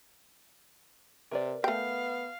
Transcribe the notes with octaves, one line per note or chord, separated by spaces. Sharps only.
C3 A#4 B4 D5
A3 B3 F5 G5